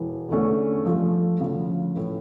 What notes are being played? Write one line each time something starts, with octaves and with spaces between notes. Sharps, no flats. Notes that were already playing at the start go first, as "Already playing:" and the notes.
Already playing: E1 E3
E2 D3 A3 C#4
G2 F3 A3
D2 C#3 F3
A2 E3 A3